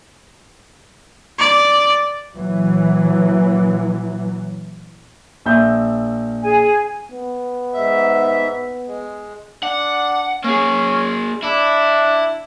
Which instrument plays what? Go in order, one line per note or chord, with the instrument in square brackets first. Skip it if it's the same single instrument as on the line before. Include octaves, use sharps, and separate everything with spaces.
[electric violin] D5
[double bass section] A#2 E3 F#3
[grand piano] A#1 E5 G6
[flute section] G#4 G#5
[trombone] B3
[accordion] G#2 E5
G#3
[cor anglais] D4 [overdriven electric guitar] F#5
[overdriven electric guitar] A#3 G#4 [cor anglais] C#4
[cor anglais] D4 [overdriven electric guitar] E4